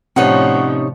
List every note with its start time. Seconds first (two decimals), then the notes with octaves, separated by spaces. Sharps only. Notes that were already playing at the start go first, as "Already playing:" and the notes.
0.16 A2 C3 F3 G3 C#4 D#4 C#5 F#5